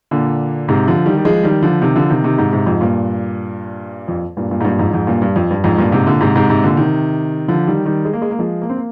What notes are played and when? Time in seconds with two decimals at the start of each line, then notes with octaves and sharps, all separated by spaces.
0.11 A#2 D3
0.68 G#2 C3
0.87 D3 F3
1.06 D#3 G3
1.17 G3
1.25 F3 G#3
1.43 D#3 G3
1.62 D3 F3
1.82 C3 D#3
1.96 D3 F3
2.10 C3 D#3
2.24 C3 D#3
2.38 G#2 C3
2.53 G#2 C3
2.66 F2 G#2
2.81 G2 A#2
4.08 F2
4.37 G2 A#2
4.51 G2 A#2
4.60 G#2
4.65 G2 A#2
4.79 F2 G#2
4.93 F2 G#2
5.07 G2 A#2
5.22 G2
5.36 F2
5.51 G2
5.64 F2 G#2
5.78 G2 A#2
5.92 G#2 C3
6.07 A#2 D3
6.21 G#2 C3
6.35 G#2 C3
6.49 G#2 C3
6.63 A#2 D3
6.77 C3 D#3
7.48 D3 F3
7.67 D#3 G3
7.85 D#3 G3
8.05 G#3
8.13 A#3
8.22 G#3
8.31 A#3
8.39 F3 G#3
8.62 A#3
8.69 C4
8.77 A#3